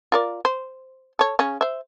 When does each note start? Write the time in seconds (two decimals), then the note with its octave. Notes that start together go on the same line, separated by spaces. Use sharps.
0.12 F4 A#4 D5
0.45 C5
1.19 A4 C#5
1.39 C#3 C#4
1.61 C5 E5